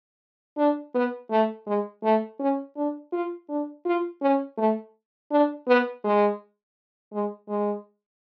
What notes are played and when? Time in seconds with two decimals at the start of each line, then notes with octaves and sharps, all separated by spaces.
0.58 D4
0.94 B3
1.30 A3
1.67 G#3
2.04 A3
2.40 C#4
2.77 D4
3.13 F4
3.49 D4
3.85 F4
4.22 C#4
4.58 A3
5.31 D4
5.67 B3
6.04 G#3
7.13 G#3
7.49 G#3